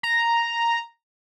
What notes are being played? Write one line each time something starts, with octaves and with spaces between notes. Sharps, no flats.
A#5